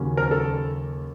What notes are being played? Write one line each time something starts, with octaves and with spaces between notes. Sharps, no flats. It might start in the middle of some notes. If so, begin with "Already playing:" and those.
Already playing: D#2 C#3 F#3 A#3 C#4
A#4
A4